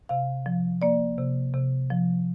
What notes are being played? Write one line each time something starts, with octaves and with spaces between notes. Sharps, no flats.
C3 F5
F3
A#3 D5
C3
C3
F3